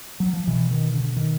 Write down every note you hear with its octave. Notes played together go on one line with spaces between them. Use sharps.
F#3
F3
B2 E3
D#3
D3
D#3